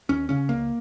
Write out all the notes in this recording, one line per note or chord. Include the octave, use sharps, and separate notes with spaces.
D#2 C#4
C#3 C#4
C#2 A#3